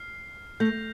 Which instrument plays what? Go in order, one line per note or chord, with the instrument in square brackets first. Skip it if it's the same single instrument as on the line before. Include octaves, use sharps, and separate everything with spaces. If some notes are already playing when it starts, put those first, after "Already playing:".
Already playing: [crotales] F6 C7
[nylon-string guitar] A3 [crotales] G6 A#6 F7